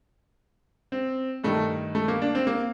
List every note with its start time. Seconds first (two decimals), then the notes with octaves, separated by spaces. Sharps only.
0.92 C4
1.44 G2 D#3 A3
1.95 A3
2.08 A#3
2.22 D4
2.35 C4
2.47 A#3